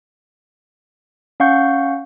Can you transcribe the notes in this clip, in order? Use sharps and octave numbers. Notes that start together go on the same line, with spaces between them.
C#4 F5 F#5 C#6 G6